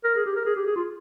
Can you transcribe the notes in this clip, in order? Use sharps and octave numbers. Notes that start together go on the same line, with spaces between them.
A#4
G#4
G4
A#4
G#4
G4
G#4
F4